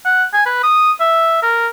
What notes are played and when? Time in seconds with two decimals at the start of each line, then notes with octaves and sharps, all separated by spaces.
0.05 F#5
0.33 G#5
0.46 B4
0.63 D#6
1.00 E5
1.43 A#4